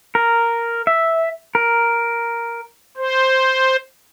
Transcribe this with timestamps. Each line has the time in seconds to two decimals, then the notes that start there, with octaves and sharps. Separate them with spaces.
0.15 A#4
0.87 E5
1.55 A#4
2.97 C5